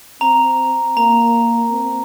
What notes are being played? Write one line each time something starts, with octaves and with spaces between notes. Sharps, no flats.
C4 A#5
A#3 A#5
C4